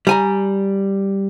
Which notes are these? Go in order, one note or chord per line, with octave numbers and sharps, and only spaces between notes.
G3 G#5 A#5